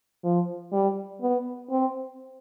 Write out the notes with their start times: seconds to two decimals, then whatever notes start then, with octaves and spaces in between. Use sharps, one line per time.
0.24 F3
0.72 G3
1.21 B3
1.70 C4